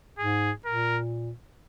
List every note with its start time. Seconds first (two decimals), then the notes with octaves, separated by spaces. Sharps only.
0.19 G#2 G#4
0.66 A#2 A#4